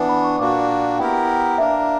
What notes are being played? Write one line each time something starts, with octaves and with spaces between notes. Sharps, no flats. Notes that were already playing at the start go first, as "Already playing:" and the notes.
Already playing: E3 B3 D4
B5
C#6
A#2 A#3 D4 F#4 D6
B3 E4 G4 A#4 G5
A#3 D4 A#4 E5